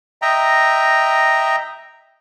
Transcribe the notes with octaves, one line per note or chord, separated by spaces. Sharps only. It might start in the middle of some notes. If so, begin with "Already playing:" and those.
D#5 E5 G5 A#5